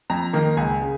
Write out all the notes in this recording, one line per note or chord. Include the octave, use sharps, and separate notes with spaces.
F2 A#5
D#3 A#3
C#2 G#5
C#3